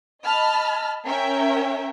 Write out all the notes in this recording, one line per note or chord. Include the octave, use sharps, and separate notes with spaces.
D#5 A5 B5 F6
C#4 A#4 E5 G5